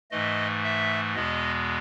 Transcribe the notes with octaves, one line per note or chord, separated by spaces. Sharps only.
G#2 E3 A3 D#5
E5
E2 B2 G#3 B3 D#5